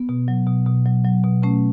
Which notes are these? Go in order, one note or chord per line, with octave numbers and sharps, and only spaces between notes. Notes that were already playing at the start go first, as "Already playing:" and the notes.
Already playing: B3
B2
F#3
B2
B2
F#3
F#3
B2
B2 A3 C#4